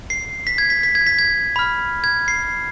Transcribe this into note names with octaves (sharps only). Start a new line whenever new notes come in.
C7
B6
G#6
B6
B6
G#6
B6
G#6
B5 F6
G#6
C7